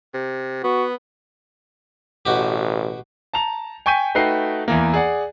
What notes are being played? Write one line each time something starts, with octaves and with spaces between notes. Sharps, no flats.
C3
B3 F#4
A1 B2 F#4 G4
A5 A#5 F7
G5 G#5 C#6 G6 B6 D#7
A3 D#4 F#4 B4 G5 C7
E2 E3 A#3
G#4 D5 F#5